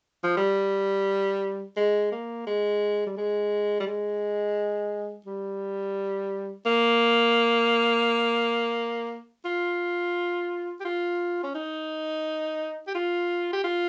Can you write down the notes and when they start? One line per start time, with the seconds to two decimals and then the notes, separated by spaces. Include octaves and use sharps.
0.24 F3
0.37 G3
1.77 G#3
2.12 A#3
2.47 G#3
3.06 G3
3.17 G#3
3.80 G3
3.87 G#3
5.26 G3
6.66 A#3
9.45 F4
10.80 G4
10.85 F4
11.43 C#4
11.55 D#4
12.87 G4
12.95 F4
13.53 G4
13.64 F4